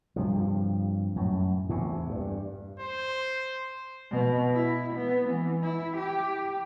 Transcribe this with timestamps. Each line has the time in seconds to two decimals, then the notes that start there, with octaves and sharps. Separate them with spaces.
0.16 G2 C3 F3
1.16 F#2 A2
1.69 E2 A2 C3
2.10 G2
2.80 C5
4.11 B2
4.54 E4
4.95 B3
5.29 E3
5.63 E4
5.97 G4